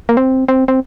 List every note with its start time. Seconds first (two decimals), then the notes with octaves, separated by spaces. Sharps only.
0.09 A#3
0.17 C4
0.48 C4
0.68 C4